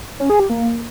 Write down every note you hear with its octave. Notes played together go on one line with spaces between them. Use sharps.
C#4
G#4
G4
A#3